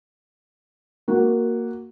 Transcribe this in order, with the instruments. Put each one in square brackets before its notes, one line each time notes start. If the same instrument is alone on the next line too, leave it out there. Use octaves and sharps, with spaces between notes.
[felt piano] A#3 F#4